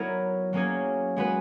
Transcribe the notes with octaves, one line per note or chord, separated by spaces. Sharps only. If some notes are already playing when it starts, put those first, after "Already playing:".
Already playing: F#3 B3 E4 A#4 C#5
F#3 A#3 C#4 G#4 C#5
G#3 B3 F#4 B4